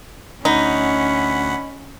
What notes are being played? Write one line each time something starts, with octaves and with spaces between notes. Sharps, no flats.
D2 C#4 D#4 F#5 B5